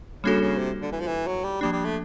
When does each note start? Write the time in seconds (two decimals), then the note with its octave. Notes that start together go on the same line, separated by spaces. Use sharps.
0.24 C#3 G3 A#3 D4 F#4 A4
0.41 C#3
0.58 C3
0.81 D3
0.92 E3
1.00 F3
1.07 E3
1.27 F#3
1.44 G3
1.61 F3 G3 A#3 D4
1.72 G3
1.84 A3